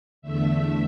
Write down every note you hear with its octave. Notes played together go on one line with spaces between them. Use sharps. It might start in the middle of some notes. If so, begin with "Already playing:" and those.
E2 D3 A3 E5